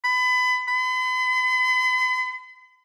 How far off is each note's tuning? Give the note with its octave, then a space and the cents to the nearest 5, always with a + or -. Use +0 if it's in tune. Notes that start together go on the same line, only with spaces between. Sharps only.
B5 +30
B5 +45